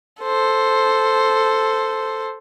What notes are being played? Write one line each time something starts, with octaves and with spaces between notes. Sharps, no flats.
A4 C5